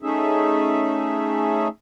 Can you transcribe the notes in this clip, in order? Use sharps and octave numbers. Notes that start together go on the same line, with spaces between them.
A3 C#4 D#4 G#4 E5